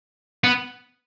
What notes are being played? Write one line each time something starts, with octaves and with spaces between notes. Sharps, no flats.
B3